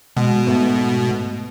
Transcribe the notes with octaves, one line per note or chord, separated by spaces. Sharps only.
B2 G#3
G#2 A3 B3